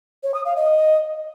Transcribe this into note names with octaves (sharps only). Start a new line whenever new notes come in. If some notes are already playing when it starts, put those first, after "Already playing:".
C#5
D#6
F5
D#5